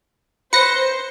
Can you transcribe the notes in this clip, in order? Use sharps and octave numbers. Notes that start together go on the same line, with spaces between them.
B4 C5 A#6 C#7